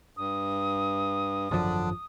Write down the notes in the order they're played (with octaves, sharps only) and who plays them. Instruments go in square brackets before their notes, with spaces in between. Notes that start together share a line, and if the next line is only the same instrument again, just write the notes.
[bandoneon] G2 [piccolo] D#6
[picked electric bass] G#1 F#2 F3 [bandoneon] D3 D4